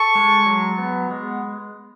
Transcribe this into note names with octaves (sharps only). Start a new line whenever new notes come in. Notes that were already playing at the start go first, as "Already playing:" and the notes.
Already playing: A4 C#6
G#3
F#3
B3
G#3